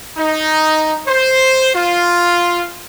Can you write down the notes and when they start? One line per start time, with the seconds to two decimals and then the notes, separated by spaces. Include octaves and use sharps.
0.18 D#4
1.07 C5
1.75 F4